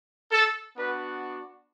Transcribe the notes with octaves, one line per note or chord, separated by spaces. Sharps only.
A4
B3 D4 F#4 B4